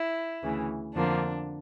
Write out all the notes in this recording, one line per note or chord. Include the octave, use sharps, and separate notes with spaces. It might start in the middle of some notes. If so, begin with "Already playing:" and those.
Already playing: E4
D2 C#3 E3
F2 D3 F3 A#3 D4